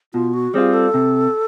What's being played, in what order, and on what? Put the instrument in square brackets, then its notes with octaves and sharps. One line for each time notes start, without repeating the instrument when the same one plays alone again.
[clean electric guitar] B2 [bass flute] F4
[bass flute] F#4
[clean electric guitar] G3 C4 F4 [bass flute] G#4
[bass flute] A4
[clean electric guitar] C3